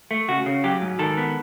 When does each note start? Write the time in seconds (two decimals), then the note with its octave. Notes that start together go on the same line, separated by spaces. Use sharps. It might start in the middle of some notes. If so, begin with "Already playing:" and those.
0.11 A3
0.28 C#3 F#4
0.46 C#3
0.64 F#3 G4
0.82 G#2
0.99 D#3 A4
1.17 B3